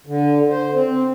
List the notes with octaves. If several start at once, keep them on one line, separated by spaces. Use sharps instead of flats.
D3
C5
C4